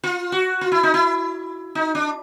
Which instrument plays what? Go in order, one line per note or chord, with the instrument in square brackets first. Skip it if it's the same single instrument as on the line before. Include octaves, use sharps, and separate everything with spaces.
[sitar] F4
F#4
F4
E4
D#4
E4
D#4
D4